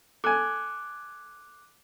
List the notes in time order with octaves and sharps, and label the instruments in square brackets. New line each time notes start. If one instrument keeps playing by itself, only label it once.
[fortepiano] A4 G#5 [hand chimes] D6 F#6